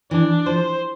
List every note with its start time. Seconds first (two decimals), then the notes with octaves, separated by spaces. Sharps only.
0.11 E3 D4
0.46 F3 C5